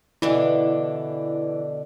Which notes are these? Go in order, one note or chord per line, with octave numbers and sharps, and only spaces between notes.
B2 D3 E3 D4